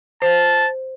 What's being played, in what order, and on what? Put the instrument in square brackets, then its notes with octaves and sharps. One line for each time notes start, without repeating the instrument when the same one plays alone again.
[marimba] C5 [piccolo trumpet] A5